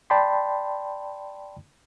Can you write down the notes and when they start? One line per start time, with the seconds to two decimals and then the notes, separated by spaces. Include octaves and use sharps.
0.10 D5 G5 A5 B5 C6